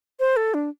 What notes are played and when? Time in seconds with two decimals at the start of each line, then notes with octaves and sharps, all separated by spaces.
0.20 C5
0.36 A4
0.54 D4